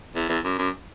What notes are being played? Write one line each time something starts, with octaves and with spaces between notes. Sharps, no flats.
E2
E2
F#2
F#2